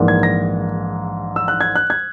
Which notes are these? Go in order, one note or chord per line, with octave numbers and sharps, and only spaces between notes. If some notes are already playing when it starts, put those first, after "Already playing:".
Already playing: A#1 G#2 E3 A#3
G#6
A#6
E6
F#6
G#6
F#6
G#6